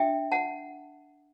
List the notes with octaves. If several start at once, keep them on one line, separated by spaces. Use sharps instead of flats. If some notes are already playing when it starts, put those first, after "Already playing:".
Already playing: D4 E5 G5
F#5 A5